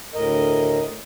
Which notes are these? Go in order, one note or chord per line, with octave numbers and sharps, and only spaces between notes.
D2 A2 A#4 D#5